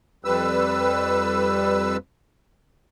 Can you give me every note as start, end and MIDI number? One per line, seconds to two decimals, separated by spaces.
0.25 1.97 41
0.25 1.97 55
0.25 1.97 71
0.25 1.97 88